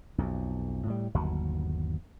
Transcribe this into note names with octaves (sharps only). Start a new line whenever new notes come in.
B1 F2
A2 G3
G1 D#2 F#3